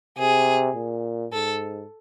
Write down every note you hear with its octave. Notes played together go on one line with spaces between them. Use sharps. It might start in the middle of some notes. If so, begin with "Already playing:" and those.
C3 G#4
A#2
G#2 A4